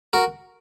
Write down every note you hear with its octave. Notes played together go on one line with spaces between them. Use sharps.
F#4 A#4